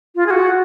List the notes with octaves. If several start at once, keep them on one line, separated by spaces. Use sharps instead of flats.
F4
G#4
F#4